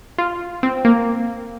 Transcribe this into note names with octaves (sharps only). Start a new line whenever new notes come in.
F4
C4
A#3